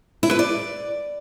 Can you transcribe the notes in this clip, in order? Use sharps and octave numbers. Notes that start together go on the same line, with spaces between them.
E4
B4
D5